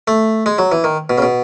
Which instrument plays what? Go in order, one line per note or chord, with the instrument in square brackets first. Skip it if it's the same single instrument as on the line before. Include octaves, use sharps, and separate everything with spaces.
[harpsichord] A3
G#3
F#3
E3
D#3
B2
C#3
B2